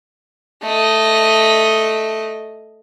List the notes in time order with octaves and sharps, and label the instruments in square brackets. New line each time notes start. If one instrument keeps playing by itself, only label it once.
[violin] A3 D#5